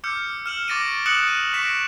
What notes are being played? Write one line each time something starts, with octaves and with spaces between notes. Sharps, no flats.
D6 E6 F6 G6 C#7
F6 E7 F#7
C#6 D6 A6 A#6 D7 D#7
D6 D#6 F#6 C#7 E7 F#7
D#7
C#6 A#6 B6 D7 E7